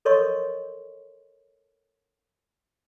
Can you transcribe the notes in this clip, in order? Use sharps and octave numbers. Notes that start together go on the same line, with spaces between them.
A4 A#4 C#5 D#5 C6 C#6